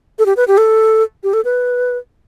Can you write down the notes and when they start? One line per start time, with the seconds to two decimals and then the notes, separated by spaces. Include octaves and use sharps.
0.19 A4
0.26 G4
0.37 B4
0.48 G4
0.58 A4
1.24 G4
1.33 A4
1.45 B4